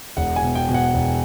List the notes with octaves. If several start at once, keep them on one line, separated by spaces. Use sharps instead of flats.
E1 F#5
G#5
B2
G5
B2
F#5
E1